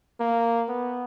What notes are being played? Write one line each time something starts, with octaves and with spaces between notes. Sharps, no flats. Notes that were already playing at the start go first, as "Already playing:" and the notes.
A#3
B3